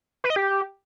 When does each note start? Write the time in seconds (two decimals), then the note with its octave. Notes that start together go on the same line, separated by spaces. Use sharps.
0.24 B4
0.30 D#5
0.36 G4